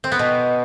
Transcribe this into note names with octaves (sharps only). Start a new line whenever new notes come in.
C4
B3
B2